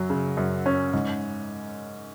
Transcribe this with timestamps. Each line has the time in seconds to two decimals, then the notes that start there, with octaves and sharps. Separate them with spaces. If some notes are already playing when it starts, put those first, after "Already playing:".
Already playing: F#2 F#3
0.10 C#3
0.37 F#2
0.66 C#4
0.94 G#2